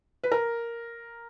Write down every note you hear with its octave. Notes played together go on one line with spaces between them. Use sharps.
B4
A#4